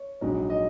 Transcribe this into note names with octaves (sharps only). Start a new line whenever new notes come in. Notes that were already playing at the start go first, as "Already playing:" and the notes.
Already playing: C#5
A#1 G#2 F#3
D#5